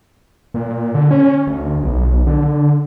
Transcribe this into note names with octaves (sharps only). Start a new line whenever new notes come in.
A#2
D3
C#4
D2
B1
D3